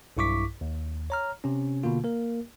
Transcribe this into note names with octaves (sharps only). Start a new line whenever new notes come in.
B1 G2 E4 C#6 D6 B6
D#2
C#5 A#5 F6
C3 C#4
B2 D3 A#3 F4
A#3 A#4